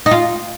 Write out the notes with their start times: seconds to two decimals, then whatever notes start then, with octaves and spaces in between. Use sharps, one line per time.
0.06 D#4
0.11 F4